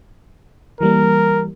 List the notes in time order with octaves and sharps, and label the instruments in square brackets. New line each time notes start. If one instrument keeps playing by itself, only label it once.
[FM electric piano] E3 G3 A#3 [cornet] A#4